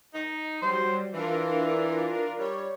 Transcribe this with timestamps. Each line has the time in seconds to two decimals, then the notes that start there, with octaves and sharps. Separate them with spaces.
0.14 D#4
0.62 F#3 G3 C5
1.14 E3 D4 F4 A#4
2.39 G3 C#5